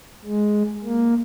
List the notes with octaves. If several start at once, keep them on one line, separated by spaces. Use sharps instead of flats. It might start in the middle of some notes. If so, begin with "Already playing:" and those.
G#3
A#3